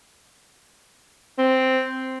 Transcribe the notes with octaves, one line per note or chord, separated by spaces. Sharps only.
C4